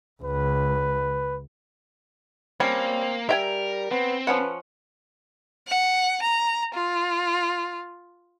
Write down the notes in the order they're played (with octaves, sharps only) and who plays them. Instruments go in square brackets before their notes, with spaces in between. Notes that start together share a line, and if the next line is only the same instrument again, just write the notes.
[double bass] C#2 [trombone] B4
[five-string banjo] G3 C#4 [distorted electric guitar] A#3 [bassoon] C4
[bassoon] G3 [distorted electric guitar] A#4 [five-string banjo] E5 G5 G#5
[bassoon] B3 [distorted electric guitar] C4
[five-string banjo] F3 C#4 F#5 [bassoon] B4
[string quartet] F#5
A#5
F4